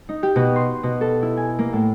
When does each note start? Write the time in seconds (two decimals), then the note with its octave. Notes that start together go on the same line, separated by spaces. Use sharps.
0.09 D#4
0.23 G4
0.36 B2
0.56 C6
0.83 B2
1.01 A4
1.22 E4
1.37 G#5
1.59 A#3
1.73 A2